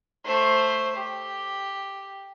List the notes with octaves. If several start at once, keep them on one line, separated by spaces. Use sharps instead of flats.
A3 C5
G4